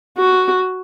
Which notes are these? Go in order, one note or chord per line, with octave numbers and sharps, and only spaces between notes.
F#4